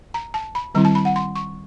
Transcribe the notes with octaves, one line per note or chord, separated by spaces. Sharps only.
A#5
A5
B5
D#3 G3 C4 E4 A#5
A5
B5
F#5
C6
C#6